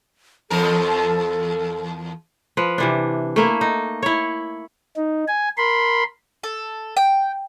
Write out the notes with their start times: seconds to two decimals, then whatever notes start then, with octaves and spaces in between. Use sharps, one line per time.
0.50 E2 F3 A4 A#4
2.57 F3 B4
2.78 C3 E3 D4
3.36 A3 A#3 E4
3.61 D#4
4.02 E4 C#5
4.96 D#4
5.28 G#5
5.58 A#4 B5 C6
6.43 A4
6.97 G5